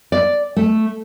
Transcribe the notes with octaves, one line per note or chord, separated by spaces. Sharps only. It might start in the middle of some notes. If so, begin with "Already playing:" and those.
D5
A3